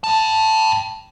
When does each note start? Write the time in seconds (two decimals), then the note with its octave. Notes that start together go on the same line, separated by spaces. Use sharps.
0.04 G5 A5